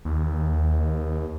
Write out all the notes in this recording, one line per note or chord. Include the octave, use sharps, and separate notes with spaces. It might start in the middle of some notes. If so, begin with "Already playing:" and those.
D#2